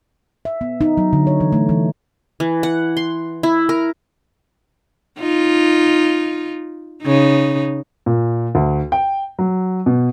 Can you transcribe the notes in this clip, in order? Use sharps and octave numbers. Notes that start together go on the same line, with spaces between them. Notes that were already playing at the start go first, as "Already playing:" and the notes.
E5
B3
D#4
F#3
D3
C#5
E3
A3
E3
E3
F#5
C6
E4
A#4
D#4 F4
C#3 D#4
A#2
D2
G5
F#3
B2